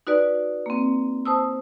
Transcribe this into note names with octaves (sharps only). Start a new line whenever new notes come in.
D#4 F#4 B4 D5
A#3 C4
C5 A5 D#6 E6